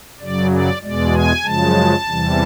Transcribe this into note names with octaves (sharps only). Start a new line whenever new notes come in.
F#2 C#3 F#3 D5
D5
E2 B2 G#3 D5
G#5
F#2 C#3 F3 G#3 A5
E2 C3 E3 G3